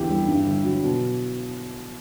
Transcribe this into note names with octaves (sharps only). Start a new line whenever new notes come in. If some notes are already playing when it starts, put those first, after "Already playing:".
Already playing: E2 D3 E4 G4
G3
G2
G1
F#3
B2